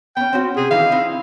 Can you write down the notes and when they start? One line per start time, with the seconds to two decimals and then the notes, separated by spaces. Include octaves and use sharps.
0.17 B3 C#4 G5
0.33 C4 C#4 F#4
0.57 C3 G#4
0.71 D#3 E3 D#4 F5
0.92 C4 D#4 E4